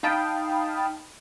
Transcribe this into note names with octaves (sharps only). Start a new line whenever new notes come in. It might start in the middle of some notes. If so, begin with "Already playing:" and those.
D#4 F5 G5 A5 B5 D#6